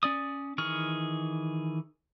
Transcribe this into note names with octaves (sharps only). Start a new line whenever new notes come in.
C#4 D5 D#6
D#3 E3 G#4 C#6 F6